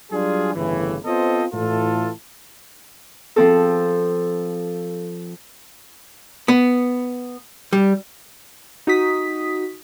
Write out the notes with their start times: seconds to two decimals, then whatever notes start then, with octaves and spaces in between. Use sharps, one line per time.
0.12 F#3 G3 D4 F4 G#4
0.54 G1 A2 C#3 E3
1.05 B3 C4 F4 A4 C5 D#5
1.53 A2 E3 E4 F4 A4
3.36 F3 C4 A4
6.48 B3
7.73 G3
8.87 D#4 F#4 D#6 B6